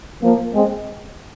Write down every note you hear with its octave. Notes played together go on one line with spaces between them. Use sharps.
F3 A#3
G#3 C4